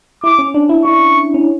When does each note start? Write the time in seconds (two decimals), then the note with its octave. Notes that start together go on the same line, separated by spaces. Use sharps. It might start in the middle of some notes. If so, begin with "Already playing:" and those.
0.24 E4 D6
0.39 C#4
0.54 D4
0.69 E4
0.84 E4 C#6
1.34 C#4